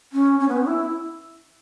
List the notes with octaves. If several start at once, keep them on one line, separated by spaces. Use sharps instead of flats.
C#4
C#4
B3
C#4
E4